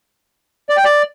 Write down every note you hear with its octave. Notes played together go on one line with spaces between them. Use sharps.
D5
G5
D5